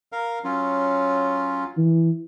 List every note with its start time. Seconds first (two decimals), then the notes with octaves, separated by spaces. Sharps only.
0.12 A#4 F5
0.44 F#3 C#4 F4
1.77 E3